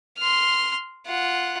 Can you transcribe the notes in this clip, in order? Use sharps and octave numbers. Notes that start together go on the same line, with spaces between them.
C6 F6
F4 F#5